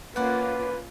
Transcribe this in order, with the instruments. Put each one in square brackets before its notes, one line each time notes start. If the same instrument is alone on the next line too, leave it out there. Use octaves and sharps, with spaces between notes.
[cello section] A#3 C#4 F4 [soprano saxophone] B4 [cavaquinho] D5 F#5